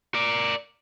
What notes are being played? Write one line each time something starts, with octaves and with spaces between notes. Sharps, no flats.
A#4 D5